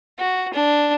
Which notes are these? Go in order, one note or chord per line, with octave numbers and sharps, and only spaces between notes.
F#4
D4